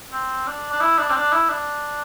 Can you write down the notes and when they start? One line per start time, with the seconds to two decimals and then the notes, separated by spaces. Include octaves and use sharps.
0.13 C4
0.47 D4
0.72 D4
0.81 E4
0.98 D4
1.10 C4
1.16 D4
1.32 E4
1.49 D4